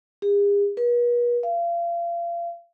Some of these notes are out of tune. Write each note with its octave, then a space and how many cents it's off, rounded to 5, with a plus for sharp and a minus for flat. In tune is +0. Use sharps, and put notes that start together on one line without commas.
G#4 -45
B4 -45
F5 -35